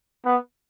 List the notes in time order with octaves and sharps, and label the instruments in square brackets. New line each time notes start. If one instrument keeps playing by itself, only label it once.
[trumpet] B3